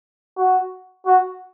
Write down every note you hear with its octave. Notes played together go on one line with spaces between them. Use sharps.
F#4
F#4